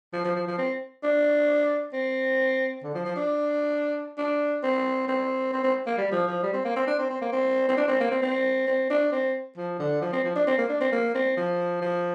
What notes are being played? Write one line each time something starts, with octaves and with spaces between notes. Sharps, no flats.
F3
F3
F3
F3
C4
D4
C4
D3
F3
F3
D4
D4
C4
C4
C4
C4
A#3
G3
F3
F3
G3
C4
A#3
C4
D4
C4
C4
A#3
C4
C4
D4
C4
A#3
C4
C4
C4
D4
C4
F3
D3
F3
C4
F3
D4
C4
A#3
D4
C4
A#3
C4
F3
F3